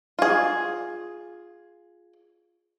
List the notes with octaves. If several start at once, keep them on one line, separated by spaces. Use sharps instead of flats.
F4 G#4